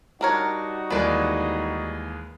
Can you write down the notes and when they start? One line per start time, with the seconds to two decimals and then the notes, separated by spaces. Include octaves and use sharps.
0.21 G3 D4 D#4 F#4 A#4 C#5
0.90 D#2 E3 G#3 B4 D5